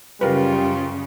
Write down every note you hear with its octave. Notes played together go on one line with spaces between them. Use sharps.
F#2 C#3 G3 F4 A#4 B4